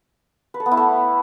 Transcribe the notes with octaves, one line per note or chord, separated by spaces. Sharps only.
B4
A4
B3
E4
A3